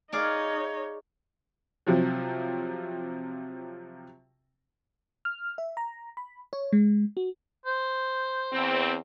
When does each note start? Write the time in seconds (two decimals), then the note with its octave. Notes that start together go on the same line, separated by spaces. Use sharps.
0.12 D#4 G#4 C#5 D5 F5
1.87 C3 F3 F#3
5.25 F6
5.58 E5
5.77 A#5
6.17 B5
6.53 C#5
6.73 G#3
7.17 F#4
7.66 C5
8.53 E2 C4